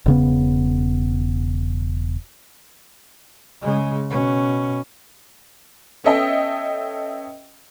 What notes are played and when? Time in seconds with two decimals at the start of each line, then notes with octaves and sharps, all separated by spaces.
0.06 E1 C#3 B3
3.62 C#3 G#3
4.10 B2 C#4
6.04 B3 C#4 A4 D#5 E5 G5